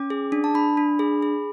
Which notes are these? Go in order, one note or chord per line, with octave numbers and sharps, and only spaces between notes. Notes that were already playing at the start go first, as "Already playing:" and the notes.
Already playing: C#4 D6
G#4
D4
A5
D4 B5
D4
G#4
G#4